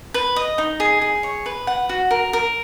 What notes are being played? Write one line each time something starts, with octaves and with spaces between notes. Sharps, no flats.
B4
D#5
D#4
G#4
G#4
C#5
B4
F#5
F#4
A#4
A#4